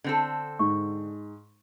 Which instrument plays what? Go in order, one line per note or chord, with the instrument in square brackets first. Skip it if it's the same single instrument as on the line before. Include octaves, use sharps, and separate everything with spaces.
[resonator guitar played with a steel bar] D3 C4 A4
[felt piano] G#2 [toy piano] C#6